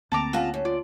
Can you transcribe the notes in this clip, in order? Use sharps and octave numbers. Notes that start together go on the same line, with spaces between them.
D2 D3 A#3 C4 A5 A#5 D6
C#3 F4 F#4 A5
F#2
F4 D5